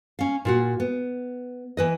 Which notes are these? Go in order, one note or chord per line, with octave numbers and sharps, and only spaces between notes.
C#4 F5
A#2 F4 F#4
B3
E3 B4 D#5